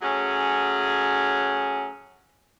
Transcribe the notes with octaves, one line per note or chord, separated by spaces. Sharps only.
F#3 A3 C#4 G#4